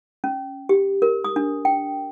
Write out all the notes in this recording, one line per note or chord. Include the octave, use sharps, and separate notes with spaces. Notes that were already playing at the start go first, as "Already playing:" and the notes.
C#4
G4
A#4
D#6
D4
G5